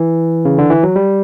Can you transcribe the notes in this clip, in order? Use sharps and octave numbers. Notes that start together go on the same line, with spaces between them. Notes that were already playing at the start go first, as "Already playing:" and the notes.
Already playing: E3
C#3
D3
E3
F#3
G3